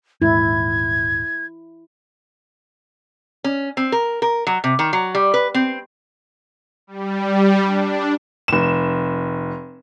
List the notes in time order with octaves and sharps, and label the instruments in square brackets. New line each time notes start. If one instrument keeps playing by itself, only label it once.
[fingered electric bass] D#1 G#2 [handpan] E4 [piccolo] G#6
[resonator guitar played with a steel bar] C#4
C4
A#4
A#4
F#3
C3
D#3
F#3
G3
B4
C4
[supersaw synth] G3
D4
[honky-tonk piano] F1 E7